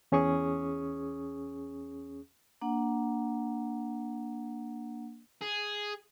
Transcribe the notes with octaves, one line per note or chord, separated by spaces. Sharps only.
E2 C#4 G#4 C#6 D#6
A#3 D4 F#5
G#4